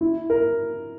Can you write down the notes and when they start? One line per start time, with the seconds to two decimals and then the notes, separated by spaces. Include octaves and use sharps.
0.01 E4
0.30 A#4